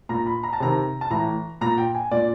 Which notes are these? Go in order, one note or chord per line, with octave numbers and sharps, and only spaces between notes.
A#2 A#5
B5
A#5
A5
C3 D#3 A#5
A5
A2 E3 A#5
A#2 A#5
G5
G#5
A#2 D5